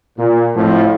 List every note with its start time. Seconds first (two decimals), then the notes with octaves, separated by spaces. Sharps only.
0.18 A#2
0.56 F2 A2 F3